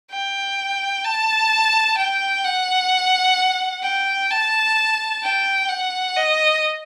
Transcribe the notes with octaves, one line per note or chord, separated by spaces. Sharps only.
G5
A5
G5
F#5
G5
A5
G5
F#5
D#5